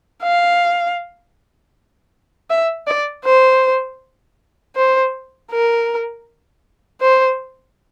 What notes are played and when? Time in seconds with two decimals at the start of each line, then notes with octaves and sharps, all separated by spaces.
0.23 F5
2.50 E5
2.88 D5
3.25 C5
4.76 C5
5.51 A#4
7.01 C5